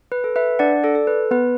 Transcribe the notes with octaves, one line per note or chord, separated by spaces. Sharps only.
B4
A4
B4 E5
D4 D5 F#5
A4 D5
A4
B4
B3 B4